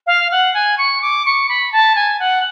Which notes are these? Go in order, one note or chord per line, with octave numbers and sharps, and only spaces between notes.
F5
F#5
G#5
C#6
D6
C#6
B5
A5
G#5
F#5